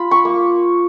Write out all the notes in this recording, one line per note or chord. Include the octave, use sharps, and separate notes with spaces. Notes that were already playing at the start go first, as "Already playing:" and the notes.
Already playing: F4 B5
C#6
A#3